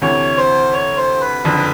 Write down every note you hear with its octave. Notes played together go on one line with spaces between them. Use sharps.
D2 C3 E3 C#5
C5
C#5
C5
B4
F#1 F2 D3